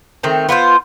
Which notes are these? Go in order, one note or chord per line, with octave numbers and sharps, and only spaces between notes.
D#3 A3 C4 A#5
B3 F4 G4 C5